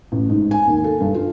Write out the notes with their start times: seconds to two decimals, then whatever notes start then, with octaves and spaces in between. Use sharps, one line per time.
0.12 A1
0.30 G#2
0.51 G#5
0.67 D#2
0.84 A4
1.00 G2
1.14 F4